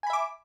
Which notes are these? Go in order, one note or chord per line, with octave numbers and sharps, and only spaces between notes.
E5 G#5 B5 D6